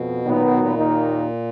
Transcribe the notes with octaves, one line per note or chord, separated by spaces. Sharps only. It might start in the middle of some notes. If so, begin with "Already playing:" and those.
Already playing: F2 B2
A#2 D#3 F#3 B3 D#4
B2
A#2
D#2 D#3 A#3 D#4